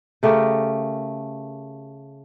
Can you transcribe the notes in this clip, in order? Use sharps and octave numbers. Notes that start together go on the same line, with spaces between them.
C#3 A3 G4 A#4